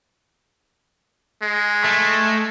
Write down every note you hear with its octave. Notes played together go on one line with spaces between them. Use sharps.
G#3
A3